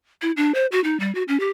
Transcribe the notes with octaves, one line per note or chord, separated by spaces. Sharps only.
E4
D4
C5
F#4
D#4
G3
F#4
C#4
G4